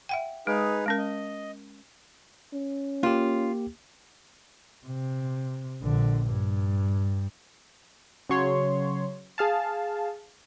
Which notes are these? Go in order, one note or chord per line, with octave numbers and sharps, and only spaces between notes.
E5 F#5 G5
G#3 D#4 G#4 B4
G#3 C#4 A#4
D#5
C#4
A#3 F4 G4
C3
A#1 D3
G2
C#3 F#3 C#5 C6
G#4 F5 A5